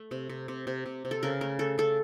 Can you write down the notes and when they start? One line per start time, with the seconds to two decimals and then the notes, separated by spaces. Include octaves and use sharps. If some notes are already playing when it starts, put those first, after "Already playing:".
Already playing: A3
0.11 C3
0.29 C3
0.48 C3
0.67 C3
0.86 C3
1.05 C3
1.11 A4
1.23 C#3 A#4
1.41 A3 A#4
1.59 A3 A4
1.78 C#3 A4